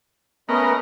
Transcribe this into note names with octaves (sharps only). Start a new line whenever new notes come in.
A3 B3 C#4 A#4 D#5